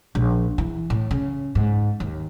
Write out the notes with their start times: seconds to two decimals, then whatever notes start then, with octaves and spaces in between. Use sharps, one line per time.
0.15 A#1
0.58 E3
0.90 A2
1.11 C#3
1.55 G#2
2.00 D#2